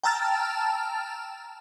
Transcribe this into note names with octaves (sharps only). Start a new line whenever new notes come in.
G5 A5 A#5 E6 F6 A6